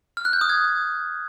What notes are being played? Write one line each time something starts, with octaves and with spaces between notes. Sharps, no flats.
F6
F#6
G6
D#6
G#6